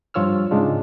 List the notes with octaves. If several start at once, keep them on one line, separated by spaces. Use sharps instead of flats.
G2 F3 F4 C#5 E6 F6
G#2 C#3 G#3 D4 F4